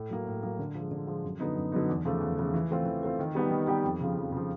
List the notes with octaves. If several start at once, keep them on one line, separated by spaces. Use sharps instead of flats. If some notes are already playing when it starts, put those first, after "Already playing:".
Already playing: A2
F#3 A#3
A2
F#3 A#3
D3
F3 G#3
D3
F3 G#3
F#2
D3 F#3 B3 D#4
F#2
D3 F#3 B3 D#4
E2
C#3 F3 A3
E2
C#3 F3 A3
E3
A3 C4 F4
E3
A3 C4 F4
D#3
G3 B3 D#4 G4
D#3
G3 B3 D#4 G4
F2
C#3 F3
F2
C#3 F3